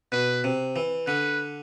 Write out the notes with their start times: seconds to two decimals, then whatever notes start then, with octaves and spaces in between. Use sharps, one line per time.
0.12 B2 B4
0.44 C3
0.76 E3
1.07 D3 B4